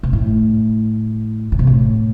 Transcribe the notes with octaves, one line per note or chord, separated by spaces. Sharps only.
C3
A2
C#3
C3
A2